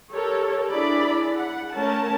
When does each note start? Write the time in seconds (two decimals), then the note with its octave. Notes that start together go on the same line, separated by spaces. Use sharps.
0.11 G4 A4 A#4 C#5
0.70 D4 E4 G#4 D5 B5
1.33 F#5
1.75 A3 C#4 A#4 A5